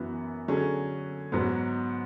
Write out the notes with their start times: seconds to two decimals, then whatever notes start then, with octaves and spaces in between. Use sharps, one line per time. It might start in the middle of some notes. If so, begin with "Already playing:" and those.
Already playing: F#2 E3 B3 F#4
0.48 D3 F#3 C#4 G#4
1.32 G#2 F#3 B3